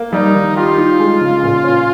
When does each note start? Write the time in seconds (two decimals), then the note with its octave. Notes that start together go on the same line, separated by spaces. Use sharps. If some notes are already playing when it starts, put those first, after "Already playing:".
Already playing: A#3
0.13 G3 D#4
0.34 D#3
0.56 F4 G4
0.78 D#4
1.00 G#3
1.21 C#3
1.43 A#2
1.64 C#4